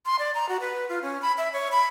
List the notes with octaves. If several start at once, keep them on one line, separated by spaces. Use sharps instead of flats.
C6
D5
A#5
F#4
B4
F4
C#4
B5
E5
C#5
B5